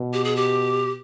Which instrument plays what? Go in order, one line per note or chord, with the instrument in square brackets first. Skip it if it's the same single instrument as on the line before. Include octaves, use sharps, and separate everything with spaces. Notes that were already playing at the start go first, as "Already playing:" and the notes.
Already playing: [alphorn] B2
[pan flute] G4
G#4
G4